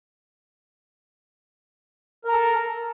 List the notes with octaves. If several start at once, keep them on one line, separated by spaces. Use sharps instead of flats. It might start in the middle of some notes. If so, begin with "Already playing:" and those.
A4 A#4 A#5